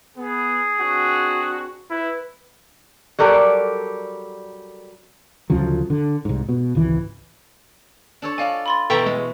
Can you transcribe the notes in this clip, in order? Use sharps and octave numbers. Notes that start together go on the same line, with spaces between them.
B3 G#4
C4 D4 F#4
E4 B4
F#3 G3 A4 A#4 D5
D2 C#3 F3 F#3
D3
C2 G#2
B2
G#1 C#2 E3
D4 A4 C#5
F4 D5 D#5 F5 G#5
B5 C6 A6
B2 E3 A4 G5 A#5 C#6 A6 B6
G#3